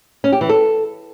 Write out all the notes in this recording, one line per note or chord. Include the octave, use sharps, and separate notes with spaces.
C#4
G4
E3
A4